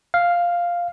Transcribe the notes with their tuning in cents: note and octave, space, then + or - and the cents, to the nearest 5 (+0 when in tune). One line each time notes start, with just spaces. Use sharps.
F5 +0